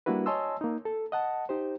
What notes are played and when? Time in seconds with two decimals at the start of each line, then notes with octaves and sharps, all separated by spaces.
0.06 G3 A#3 D4 E4 F#4 B4
0.26 C#5 D#5 G#5 A5 C6 E6
0.61 A#3 D#4
0.85 A4
1.12 D#5 F#5 A5
1.49 D#4 G4 C5